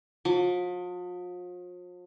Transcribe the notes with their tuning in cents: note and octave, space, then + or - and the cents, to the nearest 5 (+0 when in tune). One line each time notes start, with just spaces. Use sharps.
F3 +40